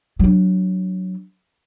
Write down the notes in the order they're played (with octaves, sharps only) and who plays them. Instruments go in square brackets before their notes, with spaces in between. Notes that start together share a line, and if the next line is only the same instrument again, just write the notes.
[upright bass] F#3 D4